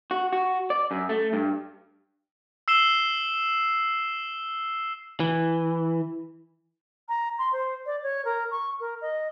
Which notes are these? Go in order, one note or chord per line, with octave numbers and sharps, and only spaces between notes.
F#4
F#4
D5
F#2
A3
G2
E6 C7 E7 G7
E3
A#5
C6
C5
D5
C#5
A#4
C#6
A#4
D#5